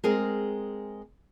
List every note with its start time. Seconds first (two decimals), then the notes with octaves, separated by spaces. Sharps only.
0.04 G#3 C4 G#4 A#4